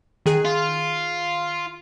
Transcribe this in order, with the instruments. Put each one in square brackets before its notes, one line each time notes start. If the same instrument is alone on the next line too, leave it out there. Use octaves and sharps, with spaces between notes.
[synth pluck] D#3 G#4 F#6
[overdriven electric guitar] F4